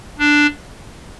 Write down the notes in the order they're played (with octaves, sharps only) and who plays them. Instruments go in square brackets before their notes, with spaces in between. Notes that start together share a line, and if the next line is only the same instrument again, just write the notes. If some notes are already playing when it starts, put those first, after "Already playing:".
[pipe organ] D4